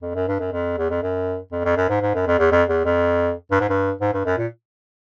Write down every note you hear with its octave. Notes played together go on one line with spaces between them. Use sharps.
F2
F#2
G2
F#2
F2
E2
F2
F#2
F2
F2
F#2
G#2
G#2
F#2
F2
E2
F2
E2
F2
G2
G#2
G2
G#2
G2
F#2
A#2